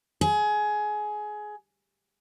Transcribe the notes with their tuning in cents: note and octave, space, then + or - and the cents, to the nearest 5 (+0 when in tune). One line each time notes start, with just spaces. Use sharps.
G#4 +20